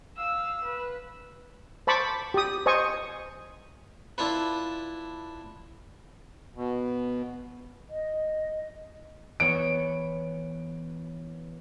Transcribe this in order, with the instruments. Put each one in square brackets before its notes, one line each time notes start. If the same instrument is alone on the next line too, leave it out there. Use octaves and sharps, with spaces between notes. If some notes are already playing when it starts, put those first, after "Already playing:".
[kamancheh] F5 E6
B4
[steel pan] C5 A5 B5 C#6 D6
G4 D#6
C5 D#5 G#5 C#6
[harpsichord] D4 E4 F4 B4
[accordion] B2
[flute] D#5
[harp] E3 B3 C#5 [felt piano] D7